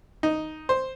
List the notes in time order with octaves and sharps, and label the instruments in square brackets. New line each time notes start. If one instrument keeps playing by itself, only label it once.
[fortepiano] D#4
C5